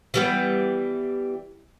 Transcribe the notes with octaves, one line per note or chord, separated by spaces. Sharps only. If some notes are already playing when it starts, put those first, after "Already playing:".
E3 G3 B3